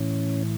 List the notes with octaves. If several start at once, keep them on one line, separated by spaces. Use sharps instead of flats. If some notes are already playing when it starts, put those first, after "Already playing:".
Already playing: A2 E3 C#4